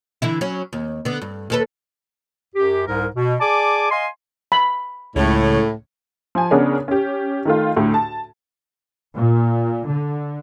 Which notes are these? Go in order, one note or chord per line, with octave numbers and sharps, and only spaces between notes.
D3 E3 E4
F#3 C#4
D#2
D3 B3
G2
D#2 A4 B4
F#2 G4
C2 G#2 A#4
B2
G#4 D5 G#5 A5 D6
D#5 F5 G#5 C6
B5
C#2 A2 C#3 C#5
F3 G#5
C#3 B3 D4 G#4 A#4 C#5
C#4 G4
D#3 A3 F4
D2 A2
A5
A#2
D3